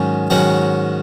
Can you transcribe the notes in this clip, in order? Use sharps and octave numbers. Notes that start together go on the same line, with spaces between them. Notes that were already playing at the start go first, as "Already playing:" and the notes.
Already playing: G#2 D#3 F#3 C#4
G#2 D#3 F#3 C#4 F#5